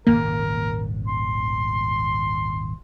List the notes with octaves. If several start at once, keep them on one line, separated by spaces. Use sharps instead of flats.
D#1 G#1 C#3 A#3 A#4
C6